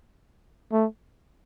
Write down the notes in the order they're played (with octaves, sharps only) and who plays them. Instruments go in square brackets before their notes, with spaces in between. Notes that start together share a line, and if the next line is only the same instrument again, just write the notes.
[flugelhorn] A3